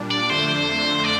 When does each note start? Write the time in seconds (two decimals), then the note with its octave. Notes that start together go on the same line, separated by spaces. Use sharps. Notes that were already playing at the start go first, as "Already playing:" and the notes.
Already playing: A#2 G3 D4
0.11 D5
0.30 F2 D3 A3 D4 C5
1.04 D5